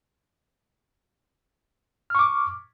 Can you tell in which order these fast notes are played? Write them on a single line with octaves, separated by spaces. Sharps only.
F6 C#6 D6